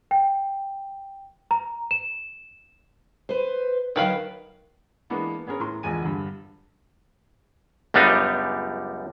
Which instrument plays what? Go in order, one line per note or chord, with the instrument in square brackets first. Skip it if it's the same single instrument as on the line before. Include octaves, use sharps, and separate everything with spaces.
[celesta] G5
A#5
E7
[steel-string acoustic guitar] B4 C5
[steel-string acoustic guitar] D3 F#3 [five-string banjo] D#3 B4 F5
[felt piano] E3 G#3 A#3 B3 D4
B3 C#4 G#4 A#4 C#5
A2 A#5 C6
E1 F3 G#3 G#5 D#7
G2 D3
[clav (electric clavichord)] C#2 F#2 G3 B3 D4 D#4